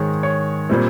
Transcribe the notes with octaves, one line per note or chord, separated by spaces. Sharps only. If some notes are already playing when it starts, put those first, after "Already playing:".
Already playing: G#2 D#3 G#3 C#5
C#5
A#2 G3 C4